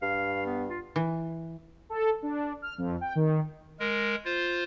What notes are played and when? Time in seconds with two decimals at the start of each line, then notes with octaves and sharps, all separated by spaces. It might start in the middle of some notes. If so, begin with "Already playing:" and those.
0.02 G2 F5
0.46 B3
0.69 F4
0.96 E3
1.90 A4
2.22 D4
2.62 F6
2.78 F2
3.01 G5
3.16 D#3
3.80 G#3 A#4
4.25 F4 C5